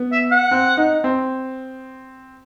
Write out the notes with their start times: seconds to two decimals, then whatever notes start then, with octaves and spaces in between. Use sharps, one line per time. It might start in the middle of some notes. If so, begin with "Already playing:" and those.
Already playing: B3
0.12 E5
0.31 F#5
0.51 C4
0.77 D#4
1.04 C4